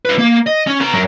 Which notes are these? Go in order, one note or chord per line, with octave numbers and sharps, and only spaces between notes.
F4 B4
A#3
D#5
C#4
B3 A#5
F#3 A#4